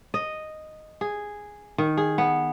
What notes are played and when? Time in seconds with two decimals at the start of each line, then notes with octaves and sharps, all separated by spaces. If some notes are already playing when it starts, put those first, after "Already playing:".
0.14 D#5
1.01 G#4
1.78 D#3
1.97 G#4
2.18 B3